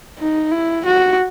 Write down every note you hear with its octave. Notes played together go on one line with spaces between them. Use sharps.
D#4
E4
F#4